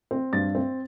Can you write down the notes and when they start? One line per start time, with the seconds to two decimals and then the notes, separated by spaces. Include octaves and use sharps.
0.11 C4
0.33 G2 A6
0.55 C4